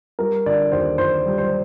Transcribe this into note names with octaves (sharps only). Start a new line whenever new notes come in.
G3 A#4
D3 D5
D#2 C5
D#2 C5
G3
C5